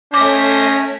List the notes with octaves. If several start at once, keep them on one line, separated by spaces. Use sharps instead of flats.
A3 C#4 A#4 C5 C#5 D#5 D6 B6